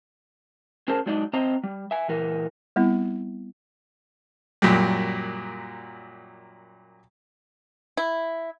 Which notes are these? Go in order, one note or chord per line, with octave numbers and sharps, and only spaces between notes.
C#4 G#4 A#4 C5 A5
F#3 G#3 D4 D#4 D5 D#5
C4 C5 D#5 A#5
G3
E5 G#5
A#2 E3 A#4
G3 B3 C4 E4
F#2 A#2 F#3 G3
E4